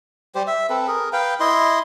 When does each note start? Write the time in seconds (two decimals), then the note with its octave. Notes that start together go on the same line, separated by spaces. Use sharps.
0.35 G3 G4 C5
0.47 E5
0.70 C4 A4 B4
0.87 G#4 A#4
1.13 B4 F5 G5
1.40 E4 D#5 C6